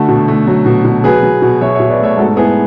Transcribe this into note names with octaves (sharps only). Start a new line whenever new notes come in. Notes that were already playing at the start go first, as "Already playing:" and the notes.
Already playing: D3 A3 F#4 A4
B2
A3
F#3
B2
B2
F#3 G#4 B4
F#3
B2
F#3 C#5 E5
C#5 E5
B2
B4 D5
A3 C#5 E5
G#2 F#4 A4
B3 E4 G#4